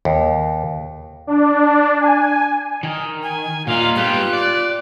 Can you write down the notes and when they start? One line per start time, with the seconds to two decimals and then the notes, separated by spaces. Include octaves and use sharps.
0.05 D#2
1.27 D4
2.01 G#5
2.83 D#3
3.23 G#5
3.67 A#2 D#4 F4 F5
3.96 G3 B3 G4 F#6
4.33 D5